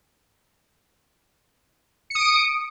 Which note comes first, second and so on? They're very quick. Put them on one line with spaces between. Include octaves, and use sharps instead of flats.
C#7 D#6 D7